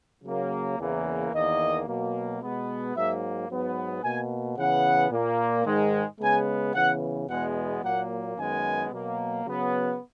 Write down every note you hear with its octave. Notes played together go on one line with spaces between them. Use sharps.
C#3 F#3 A#3
E2 C#3 E3 A#3
E2 D#3 A#3 D#5
B2 F#3 A#3
B2 G#3 B3
G#2 F#3 A#3 E5
G#2 F#3 B3
B2 A#3 G#5
C#3 E3 B3 F#5
A#2 A#3
G#2 D#3 G#3
C#3 G#3 B3 G#5
C#3 E3 B3 F#5
E2 B2 G#3 B3 F#5
A#2 F#3 A#3 F#5
F#2 D#3 G#3 B3 G#5
B2 F#3 A#3
C#3 F#3 B3